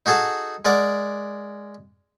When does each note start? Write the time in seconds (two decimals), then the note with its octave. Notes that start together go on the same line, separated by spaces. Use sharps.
0.06 D#4 F#4 G#4 A4 F#5 A5
0.65 G#3 A#4 D5 F#5 D6